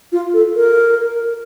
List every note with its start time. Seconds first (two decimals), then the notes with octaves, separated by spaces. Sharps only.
0.12 F4
0.34 A4
0.56 A#4